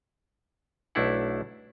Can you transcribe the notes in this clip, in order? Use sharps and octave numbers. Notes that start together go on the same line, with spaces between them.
B1 A3 D4 E4 F#5